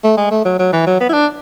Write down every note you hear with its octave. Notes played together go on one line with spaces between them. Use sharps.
A3
G#3
A3
F#3
F#3
E3
F#3
B3
E4
D4